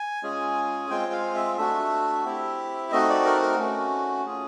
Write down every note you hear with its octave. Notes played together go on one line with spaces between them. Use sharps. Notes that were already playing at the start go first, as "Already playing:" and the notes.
Already playing: G#5
G#3 C#4 F4 G#4
G#3 C4 F4 G5
F5
E5
A3 D4 F#4 E5
C4 E4 G4
A3 C4 D#4 F#4 D#5
D5
A#4
A#4
A3 C#4 F#4
C#4 F4 G#4